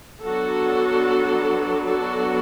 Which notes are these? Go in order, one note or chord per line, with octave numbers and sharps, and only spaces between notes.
F#3 B3 D4 F#4 A4
F#4 A4